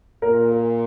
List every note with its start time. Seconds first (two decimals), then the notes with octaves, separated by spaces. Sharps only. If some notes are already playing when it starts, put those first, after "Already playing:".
0.22 A#2 A#4
0.51 A#4